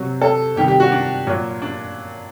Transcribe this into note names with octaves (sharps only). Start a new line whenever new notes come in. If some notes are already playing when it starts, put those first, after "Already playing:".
Already playing: C3 F#3
A4
C3 D#3 G3 G4
G4
F#4
D4
A#2 F#3
D4